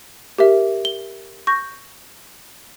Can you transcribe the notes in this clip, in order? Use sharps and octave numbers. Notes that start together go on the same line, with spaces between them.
G4 A#4 E5
G7
C#6 G6 A#6